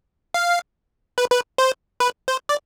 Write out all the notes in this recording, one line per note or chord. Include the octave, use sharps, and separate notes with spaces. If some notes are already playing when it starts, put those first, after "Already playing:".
F5
B4
B4
C5
B4
C5
D5